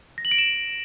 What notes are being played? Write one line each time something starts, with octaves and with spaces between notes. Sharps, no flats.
A#6
F#7
D7
E7